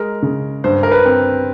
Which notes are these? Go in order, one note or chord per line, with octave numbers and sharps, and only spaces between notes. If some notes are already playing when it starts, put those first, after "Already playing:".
Already playing: G#3 A#4
C#3
G2 C5
A#4
B4
C4